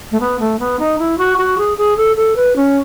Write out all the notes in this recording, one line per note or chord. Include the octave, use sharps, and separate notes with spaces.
A3
B3
A3
B3
D#4
E4
F#4
F#4
G#4
G#4
A4
A4
B4
C#4